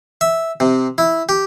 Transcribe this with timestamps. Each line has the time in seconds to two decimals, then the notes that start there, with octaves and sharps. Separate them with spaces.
0.21 E5
0.60 C3
0.98 E4
1.29 G4